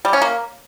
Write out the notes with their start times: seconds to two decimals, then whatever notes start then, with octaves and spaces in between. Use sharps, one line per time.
0.05 G3
0.13 C#4
0.22 A#3